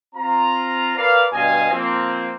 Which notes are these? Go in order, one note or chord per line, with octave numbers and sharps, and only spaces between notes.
C4 F4 A#5
A#4 B4 D5 F5
G2 B2 D#5 F5 G#5
F3 A#3 C4